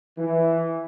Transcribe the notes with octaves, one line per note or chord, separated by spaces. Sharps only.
E3